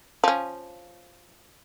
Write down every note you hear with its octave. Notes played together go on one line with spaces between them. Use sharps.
F3 C#4